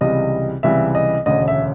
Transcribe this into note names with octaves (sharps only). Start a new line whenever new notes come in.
C#2 C3 E3 G3 D#5
C#2 C3 E3 G3 E5
D#5
E1 D2 C#3 D#5
E5